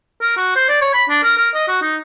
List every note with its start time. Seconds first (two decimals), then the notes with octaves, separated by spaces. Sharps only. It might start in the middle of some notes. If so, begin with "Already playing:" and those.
0.21 A#4
0.37 F#4
0.56 C5
0.69 D5
0.81 C#5
0.94 B5
1.09 D4
1.24 A#4
1.37 A#4
1.55 D#5
1.68 F#4
1.82 D#4